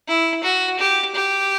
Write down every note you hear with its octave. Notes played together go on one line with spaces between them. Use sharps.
E4
F#4
G4
G4